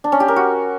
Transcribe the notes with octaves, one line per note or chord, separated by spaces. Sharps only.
D4
C#4
G4
A#4
F#4